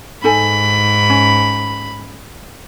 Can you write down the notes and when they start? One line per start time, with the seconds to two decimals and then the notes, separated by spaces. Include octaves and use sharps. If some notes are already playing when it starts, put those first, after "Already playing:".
0.24 G#2 D#4 A4 G#5 B5
1.10 C#4